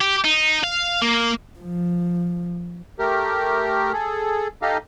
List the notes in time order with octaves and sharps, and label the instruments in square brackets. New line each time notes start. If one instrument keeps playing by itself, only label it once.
[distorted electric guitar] G4
D#4
F5
A#3
[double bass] F3
[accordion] A3 G4 A#4
G#4 A4
D#4 G4 A4 D#5 F5